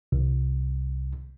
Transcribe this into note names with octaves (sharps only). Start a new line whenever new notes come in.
C2